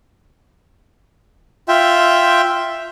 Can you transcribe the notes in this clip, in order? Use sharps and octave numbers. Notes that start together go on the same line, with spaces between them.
F4 E5 G5